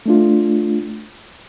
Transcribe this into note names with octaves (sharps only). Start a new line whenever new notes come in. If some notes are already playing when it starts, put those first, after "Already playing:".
A3 D4 F4